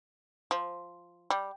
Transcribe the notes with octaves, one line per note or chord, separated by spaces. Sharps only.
F3
G3